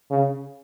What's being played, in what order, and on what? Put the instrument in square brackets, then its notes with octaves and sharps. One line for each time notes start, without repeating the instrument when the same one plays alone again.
[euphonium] C#3